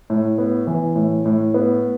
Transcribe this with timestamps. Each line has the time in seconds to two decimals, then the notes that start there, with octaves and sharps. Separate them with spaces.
0.10 A2
0.38 B3
0.67 E3
0.95 A2
1.26 A2
1.54 B3